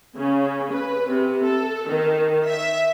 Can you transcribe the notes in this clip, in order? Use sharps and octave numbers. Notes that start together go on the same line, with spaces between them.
C#3
B4
C3
A4
D#3
E5